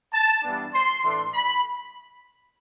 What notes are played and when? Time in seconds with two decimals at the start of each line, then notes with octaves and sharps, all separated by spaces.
0.13 A5
0.43 G2 E3 B3 D4
0.74 C6
1.04 A2 E3 A3 D4 C6
1.34 B5